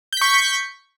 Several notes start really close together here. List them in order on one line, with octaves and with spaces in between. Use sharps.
G6 B6 C#6